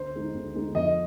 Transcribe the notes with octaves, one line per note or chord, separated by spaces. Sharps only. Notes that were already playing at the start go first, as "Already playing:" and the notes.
Already playing: D2 C5
D3 G#3 D#4
D2
D3 G#3 D#4
F2 D#5